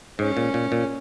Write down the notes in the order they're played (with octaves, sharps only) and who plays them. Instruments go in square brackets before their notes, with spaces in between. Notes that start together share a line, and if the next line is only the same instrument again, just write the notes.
[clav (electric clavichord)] G#2 [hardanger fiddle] C#4
[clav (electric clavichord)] A#2
A#2
A#2